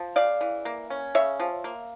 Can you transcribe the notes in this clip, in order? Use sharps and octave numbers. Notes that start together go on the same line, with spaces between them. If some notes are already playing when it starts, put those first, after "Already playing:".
Already playing: F3
C#3 D5 F5
E3
A#3
C#4
C#3 C#5 E5
F3
A#3